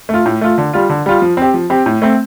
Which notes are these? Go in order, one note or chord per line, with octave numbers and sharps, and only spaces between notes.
A3 F4
A2
A3 F4
D3
G3 F4
D3
G3 F4
F3
C4 G4
F3
C4 G4
A2
A3 C4